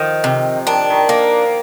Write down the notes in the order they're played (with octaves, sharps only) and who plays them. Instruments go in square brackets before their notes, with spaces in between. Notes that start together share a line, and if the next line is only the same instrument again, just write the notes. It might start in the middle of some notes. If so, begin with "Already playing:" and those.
Already playing: [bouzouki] D#3 [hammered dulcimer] F3
[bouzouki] C3
[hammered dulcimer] D#3 [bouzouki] D4
[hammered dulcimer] D#3
[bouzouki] A#3